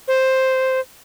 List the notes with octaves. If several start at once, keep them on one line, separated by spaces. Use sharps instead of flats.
C5